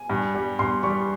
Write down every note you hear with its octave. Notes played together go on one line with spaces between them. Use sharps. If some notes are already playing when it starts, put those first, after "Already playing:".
Already playing: G#5
G2
G3
G2 C6
G3 C#6